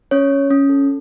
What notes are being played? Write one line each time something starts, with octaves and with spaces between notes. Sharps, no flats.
C#4 C#5
C#4
C#4
A4